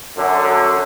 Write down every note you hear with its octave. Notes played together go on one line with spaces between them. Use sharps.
F#2 D3